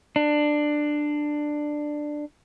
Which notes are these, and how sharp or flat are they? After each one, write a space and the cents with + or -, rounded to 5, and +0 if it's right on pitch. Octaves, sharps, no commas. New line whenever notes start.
D4 +15